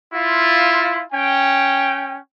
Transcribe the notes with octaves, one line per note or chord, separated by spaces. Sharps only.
E4 F4
C#4 G5